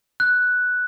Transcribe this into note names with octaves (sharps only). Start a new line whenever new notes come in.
F#6